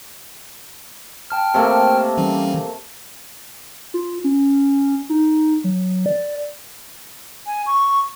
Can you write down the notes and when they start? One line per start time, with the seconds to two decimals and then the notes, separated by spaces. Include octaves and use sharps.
1.30 G5 A5 F6
1.54 C3 A3 A#3
2.17 E3 G3 C#4
3.94 F4
4.24 C#4
5.10 D#4
5.64 F#3
6.06 D5
7.46 G#5
7.67 C#6